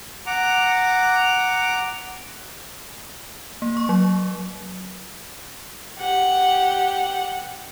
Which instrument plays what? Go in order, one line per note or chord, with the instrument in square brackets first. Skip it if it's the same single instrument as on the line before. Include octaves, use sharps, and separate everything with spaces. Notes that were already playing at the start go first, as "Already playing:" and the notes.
[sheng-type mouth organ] F#5 A#5 D6
[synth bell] A#3
C#6
F#3
[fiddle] G4 F#5